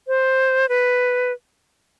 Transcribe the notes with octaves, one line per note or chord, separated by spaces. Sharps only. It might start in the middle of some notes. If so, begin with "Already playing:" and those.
C5
B4